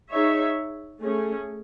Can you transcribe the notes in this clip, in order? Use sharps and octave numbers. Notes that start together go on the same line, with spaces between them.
D#4 G#4 C#5 E5
A3 C#4 G#4